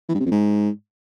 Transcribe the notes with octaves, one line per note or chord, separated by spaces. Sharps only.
E3
G2
C3
F2
G#2